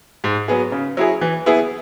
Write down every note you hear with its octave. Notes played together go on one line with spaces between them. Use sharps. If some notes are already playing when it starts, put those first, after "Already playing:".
G#2
F#3 B3 G#4
C#3
F#3 E4 G#4
E3
B3 E4 G#4